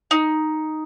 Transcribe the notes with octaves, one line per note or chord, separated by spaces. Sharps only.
D#4